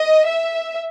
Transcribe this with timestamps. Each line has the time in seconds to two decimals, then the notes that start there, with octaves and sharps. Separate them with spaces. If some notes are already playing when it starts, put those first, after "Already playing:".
Already playing: D#5
0.26 E5